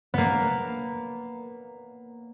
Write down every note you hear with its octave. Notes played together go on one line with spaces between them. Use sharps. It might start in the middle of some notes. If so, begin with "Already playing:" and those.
A#3 B3